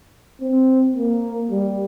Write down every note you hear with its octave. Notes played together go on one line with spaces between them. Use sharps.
C4
A#3
G3